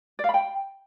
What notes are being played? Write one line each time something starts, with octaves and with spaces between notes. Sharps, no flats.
D5
F5
B5
G5